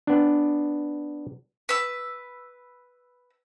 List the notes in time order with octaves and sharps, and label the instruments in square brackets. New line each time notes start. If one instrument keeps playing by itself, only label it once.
[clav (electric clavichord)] B3 D4
[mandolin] B4 E6